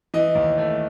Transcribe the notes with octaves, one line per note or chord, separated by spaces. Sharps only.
E3 D#5
D#2
A3